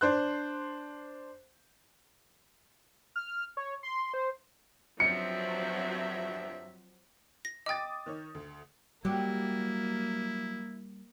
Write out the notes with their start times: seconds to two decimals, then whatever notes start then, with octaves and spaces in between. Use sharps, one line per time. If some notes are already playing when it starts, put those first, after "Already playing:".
0.01 D4 C5 F#6
3.16 F6
3.57 C#5
3.83 C6
4.14 C5
5.00 D2 G2 F3 F#3 C4 E5 C#7
7.45 A#6
7.66 D#5 G5 D6 D#6 A6
8.06 D#3 D#4 C#5
8.35 D2
9.05 F#3 G3 A#3 E4 G4